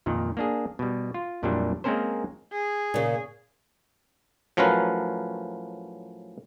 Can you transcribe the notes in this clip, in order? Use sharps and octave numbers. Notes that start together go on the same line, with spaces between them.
F2 A#2 D#3
A#3 D4 G#4
B2 G3
F4
F2 A#2 F#3 G3 D4 E4
G#3 A#3 C4 C#4 A#4 C5
G#4
A#2 C#3
A2 F3 F#3 C#4 A#4 B4